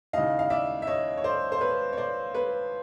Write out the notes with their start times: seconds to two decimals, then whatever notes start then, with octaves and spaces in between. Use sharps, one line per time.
0.13 D#2 C#3 E3 D#5 F5
0.39 F5
0.50 D5 E5
0.82 E5
0.87 C#5 D#5
1.17 C#5
1.24 C5 D5
1.52 C5
1.61 B4 C#5
1.93 C#5
1.97 C5 D5
2.34 B4 C#5